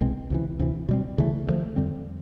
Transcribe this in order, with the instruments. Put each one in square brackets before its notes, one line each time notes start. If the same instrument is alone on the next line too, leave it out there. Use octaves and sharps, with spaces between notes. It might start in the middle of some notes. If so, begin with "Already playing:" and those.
[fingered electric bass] C2 B2 G#3 C4
C#2 C3 E3
D2 C3 E3
B2 G3 C4
D2 C#3 E3 A3
D2 D3 F3 A3
F2 D3 G3 C4